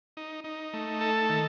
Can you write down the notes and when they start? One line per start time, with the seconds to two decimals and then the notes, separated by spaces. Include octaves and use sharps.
0.17 D#4
0.44 D#4
0.73 A3
1.01 A4
1.29 D#3